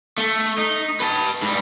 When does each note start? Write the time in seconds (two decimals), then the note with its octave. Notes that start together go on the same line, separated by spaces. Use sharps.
0.18 A3
0.58 D#4
1.00 B4 A5
1.42 G#2 G3